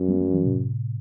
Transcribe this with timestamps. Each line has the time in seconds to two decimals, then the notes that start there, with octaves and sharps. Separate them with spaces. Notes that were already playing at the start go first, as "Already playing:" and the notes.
Already playing: F#2
0.08 G3 B3
0.20 F#3 A3
0.33 E3 G3
0.45 A2 C3